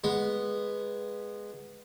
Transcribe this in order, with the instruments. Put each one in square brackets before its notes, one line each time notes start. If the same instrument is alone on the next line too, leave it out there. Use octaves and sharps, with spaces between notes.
[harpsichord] G#3 B3